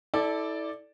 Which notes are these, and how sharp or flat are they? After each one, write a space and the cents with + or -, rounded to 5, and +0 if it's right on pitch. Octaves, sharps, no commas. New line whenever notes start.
E4 -30 A4 -10 D5 +0